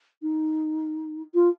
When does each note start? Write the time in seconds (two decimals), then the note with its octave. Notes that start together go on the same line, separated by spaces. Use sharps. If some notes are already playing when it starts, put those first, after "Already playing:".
0.22 D#4
1.34 F4